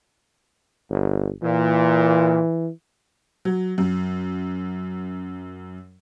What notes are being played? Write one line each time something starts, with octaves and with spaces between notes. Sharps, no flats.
G1
A#2 E3
F#3
F#2